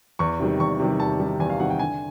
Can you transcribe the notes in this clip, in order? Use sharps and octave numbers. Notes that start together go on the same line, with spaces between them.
E2 C#6
C3 D#3 G3
E2 C#6
C3 D#3 G3
E2 A5
C3 D#3 G3
E2 G#5
F5
C3 D#3 G3 F#5
G5
D3 G#5